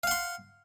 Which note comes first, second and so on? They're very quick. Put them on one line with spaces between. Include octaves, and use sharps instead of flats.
F5 F#5 C6